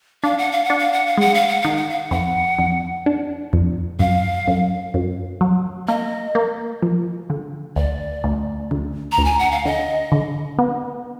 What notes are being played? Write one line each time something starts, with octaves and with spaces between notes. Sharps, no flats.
D4 F5
F#5
F5
F#5
D4
F5
F#5
F5
G#3 F#5
F5
F#5
D#3 F5
F#5
F5
F2 F#5
F2
D4
F2
F#2 F5
F#2
F#2
F#3
A#3 D#5
A#3
F3
D3
D2 D5
D2
D2
A#5
D2
G#5
F#5
F5
D3 D#5
D3
B3